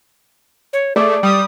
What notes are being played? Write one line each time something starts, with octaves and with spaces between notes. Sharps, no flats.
C#5
A3 G#4 D5
G3 D#6